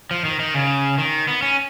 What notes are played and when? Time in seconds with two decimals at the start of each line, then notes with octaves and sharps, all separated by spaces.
0.11 F3
0.25 D#3
0.40 D#3
0.55 C#3
0.98 D#3
1.28 B3
1.42 C#4